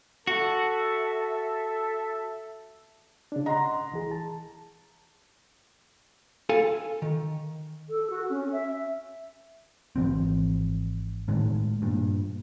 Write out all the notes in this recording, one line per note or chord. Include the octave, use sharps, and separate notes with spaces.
F#4 A4 E5
C#3 D4
D#5 F#5 A#5 C6
C2 E3 G#4
A5
A4 F5 G#5
D#3
A4
F#4
C#4
E5
G#1 E3 F3 C4
A2 D#3 G#3
G2 A#2